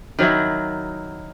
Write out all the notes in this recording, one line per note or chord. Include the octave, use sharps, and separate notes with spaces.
D#3 F#3 D#4 E4